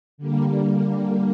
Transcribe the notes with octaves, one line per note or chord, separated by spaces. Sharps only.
D3 G3 A#3